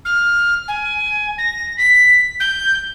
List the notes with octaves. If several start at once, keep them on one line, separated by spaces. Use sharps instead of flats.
F6
G#5
A#6
B6
G6